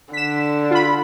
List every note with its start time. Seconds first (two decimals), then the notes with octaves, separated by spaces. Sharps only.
0.13 D3 B6 E7
0.71 F4 B5